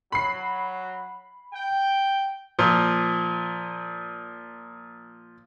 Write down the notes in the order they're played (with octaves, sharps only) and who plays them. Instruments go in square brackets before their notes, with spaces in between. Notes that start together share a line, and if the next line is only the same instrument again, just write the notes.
[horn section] F#3 [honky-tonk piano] B5 C7
[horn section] G5
[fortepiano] A#2 F3